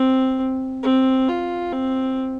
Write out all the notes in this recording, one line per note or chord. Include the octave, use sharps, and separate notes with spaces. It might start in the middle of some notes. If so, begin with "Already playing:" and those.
Already playing: C4
C4
F4
C4